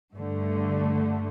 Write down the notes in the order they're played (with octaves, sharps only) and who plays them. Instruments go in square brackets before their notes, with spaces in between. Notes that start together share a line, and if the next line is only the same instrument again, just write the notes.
[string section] G2 D3 A3